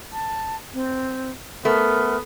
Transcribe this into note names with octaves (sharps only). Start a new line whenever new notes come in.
A5
C4
A3 B3 A#4